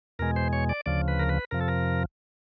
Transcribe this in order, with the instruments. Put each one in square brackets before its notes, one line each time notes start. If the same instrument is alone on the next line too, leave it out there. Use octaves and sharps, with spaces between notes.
[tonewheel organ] E2 B2 G#3 A#4
C5
C#5
D5
D2 C#3 F3 D5
B4
A#4
B4
F2 C3 F3 A#4
A4
A#4